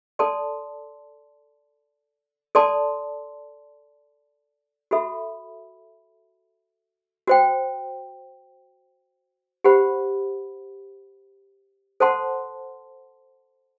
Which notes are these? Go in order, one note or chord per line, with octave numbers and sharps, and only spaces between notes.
A4 D5 A5 C6
A4 D5 A5 C6
F#4 A4 E5 B5
F#4 C5 G5
G4 C5 F#5 B5
A4 C5 F#5 A5 C6